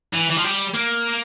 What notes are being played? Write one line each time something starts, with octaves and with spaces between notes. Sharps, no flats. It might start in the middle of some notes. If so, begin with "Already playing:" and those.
E3
E3
F3
G3
A#3